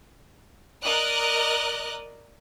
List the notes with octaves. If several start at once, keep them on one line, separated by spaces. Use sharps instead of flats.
A#4 D5 D#5 F#6